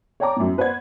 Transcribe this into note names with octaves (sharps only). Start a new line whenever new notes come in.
C#5 D5 G5 A5 A#5 D6
F#2 A2
B4 C5 D5 F#5 G#6